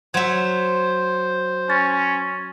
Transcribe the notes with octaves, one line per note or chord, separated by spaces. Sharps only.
F#3 C5 E5 F#5 G#6
C#4 C6 A6